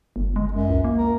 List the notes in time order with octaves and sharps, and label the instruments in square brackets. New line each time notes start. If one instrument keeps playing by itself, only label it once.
[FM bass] G1
G#3
[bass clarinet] F#2
[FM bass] C#2
A#3
[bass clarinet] A#4